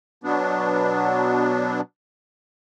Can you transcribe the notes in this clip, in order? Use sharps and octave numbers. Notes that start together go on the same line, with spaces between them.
B2 F#3 B3 D4